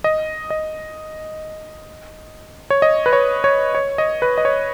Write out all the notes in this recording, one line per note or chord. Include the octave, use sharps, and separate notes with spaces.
D#5
D#5
C#5
D#5
B4
C#5
C#5
C#5
D#5
B4
D#5
C#5